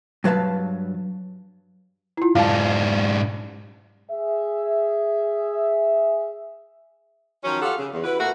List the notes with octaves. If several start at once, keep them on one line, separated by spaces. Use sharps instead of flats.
G2 F#3 B4 F5 A5
E4 F4
G#2 D4 F5 A5
G#4 E5
D#3 F3 F#3 C#4
F4 G4 A4 F5 F#5
C#3
E2
E4 F#4 B4
A#2 A3 A#3 F#4